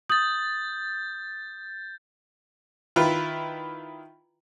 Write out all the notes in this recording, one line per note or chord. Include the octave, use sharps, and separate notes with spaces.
D#6 G6 A6 F#7
D#3 E4 F4 B4